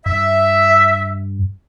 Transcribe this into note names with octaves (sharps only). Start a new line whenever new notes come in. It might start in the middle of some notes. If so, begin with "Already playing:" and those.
G2 E5